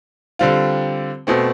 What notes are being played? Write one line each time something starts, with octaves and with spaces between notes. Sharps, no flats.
D3 G3 C4 F4
B2 A3 C4